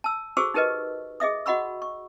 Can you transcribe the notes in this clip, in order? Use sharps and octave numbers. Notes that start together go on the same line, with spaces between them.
A5 E6
F#4 G#4 A4 C5 C#6 E6
D#4 G4 A#4 B4 D#5
G#4 D#5 E5 D#6
F#4 D#5 F#5 B5 C#6 E6
C#6